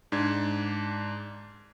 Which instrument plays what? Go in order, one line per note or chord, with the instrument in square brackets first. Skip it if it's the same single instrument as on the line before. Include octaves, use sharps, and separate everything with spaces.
[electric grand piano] G#2 D4 G#6